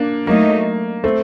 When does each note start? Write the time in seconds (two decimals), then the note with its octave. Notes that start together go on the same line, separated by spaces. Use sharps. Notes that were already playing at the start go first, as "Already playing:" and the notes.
Already playing: A#3 D4
0.27 F#3 A3 A#3 D#4
1.04 A3 C4